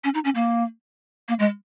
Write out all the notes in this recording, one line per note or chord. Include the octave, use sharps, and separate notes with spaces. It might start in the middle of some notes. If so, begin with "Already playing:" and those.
C#4
D#4
C#4
A#3
A#3
G#3